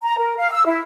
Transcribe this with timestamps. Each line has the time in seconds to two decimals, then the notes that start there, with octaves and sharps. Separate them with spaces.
0.03 A#5
0.18 A#4
0.37 F5
0.51 E6
0.66 E4